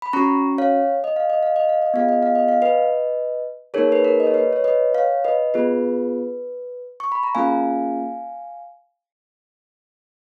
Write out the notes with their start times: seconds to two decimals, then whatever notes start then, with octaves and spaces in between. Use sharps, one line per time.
0.02 B5
0.13 C#4 F#4 A#5 C#6
0.58 C#5 F5
1.04 D#5
1.16 F5
1.30 D#5
1.43 F5
1.56 D#5
1.69 F5
1.82 D#5
1.94 B3 F4 G#4 F5
2.09 D#5
2.22 F5
2.35 D#5
2.48 F5
2.62 B4 D#5
3.74 A#3 D#4 G#4 A#4 C#5
3.92 B4
4.05 A#4
4.20 D#5
4.27 C#5
4.34 B4
4.53 C#5
4.64 B4 D#5
4.94 C#5 F5
5.24 B4 D#5
5.54 B3 F4 G#4 B4
7.00 C#6
7.12 B5
7.23 A#5
7.35 A#3 C#4 F4 G#4 F5 G#5